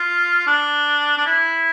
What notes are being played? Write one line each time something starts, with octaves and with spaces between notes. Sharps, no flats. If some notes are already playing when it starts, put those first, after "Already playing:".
Already playing: F4
D4
D4
E4